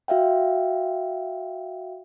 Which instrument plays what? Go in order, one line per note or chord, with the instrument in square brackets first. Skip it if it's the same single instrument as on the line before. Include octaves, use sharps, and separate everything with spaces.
[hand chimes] F#4 E5 F5 G5